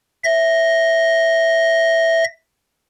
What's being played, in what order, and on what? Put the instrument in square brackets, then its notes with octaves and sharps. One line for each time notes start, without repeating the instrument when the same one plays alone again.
[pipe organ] E5 A#6